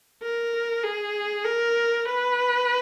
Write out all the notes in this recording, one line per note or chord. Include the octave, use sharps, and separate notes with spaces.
A#4
G#4
A#4
B4